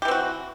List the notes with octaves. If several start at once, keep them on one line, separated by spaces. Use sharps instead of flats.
E3 C4 F#4 G4